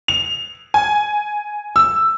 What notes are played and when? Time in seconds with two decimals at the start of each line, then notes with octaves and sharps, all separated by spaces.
0.08 F7
0.74 G#5
1.76 E6